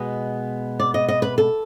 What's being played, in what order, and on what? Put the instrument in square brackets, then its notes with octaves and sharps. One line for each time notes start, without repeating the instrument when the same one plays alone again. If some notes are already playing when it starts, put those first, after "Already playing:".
Already playing: [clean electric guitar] B2 G#3 B3 [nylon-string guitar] D#5
[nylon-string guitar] D5
D#5
D#5
B4
A4